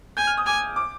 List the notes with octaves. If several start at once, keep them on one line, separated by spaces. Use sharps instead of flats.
G#5 G6
F6
D#6
G#5 D6
D6